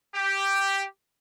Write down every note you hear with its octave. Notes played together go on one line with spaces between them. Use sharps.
G4